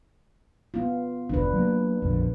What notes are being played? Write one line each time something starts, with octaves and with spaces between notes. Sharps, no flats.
B3 F4
F1 D2 D4 B4
F#3 A#3
A#1 F2 D3